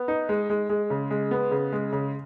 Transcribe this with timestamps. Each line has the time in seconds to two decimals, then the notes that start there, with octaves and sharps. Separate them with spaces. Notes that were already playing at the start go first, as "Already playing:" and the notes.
Already playing: B3
0.08 D#4
0.29 G#3
0.50 G#3
0.69 G#3
0.90 C#3
1.10 G#3
1.31 B3
1.51 C#3
1.72 G#3
1.92 C#3